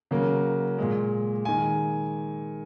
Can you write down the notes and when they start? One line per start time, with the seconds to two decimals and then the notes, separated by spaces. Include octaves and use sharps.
0.11 C#3 F#3 A#3
0.78 A#2 G#3
1.45 D#3 G#3 G#5